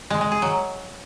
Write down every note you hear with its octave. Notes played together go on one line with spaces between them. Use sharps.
G#3
G#3
G#4
F#3